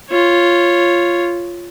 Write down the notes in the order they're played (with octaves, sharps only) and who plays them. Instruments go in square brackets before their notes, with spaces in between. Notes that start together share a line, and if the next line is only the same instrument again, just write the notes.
[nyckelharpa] F4 C#5